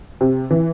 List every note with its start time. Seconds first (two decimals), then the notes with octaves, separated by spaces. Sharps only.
0.21 C3
0.51 E3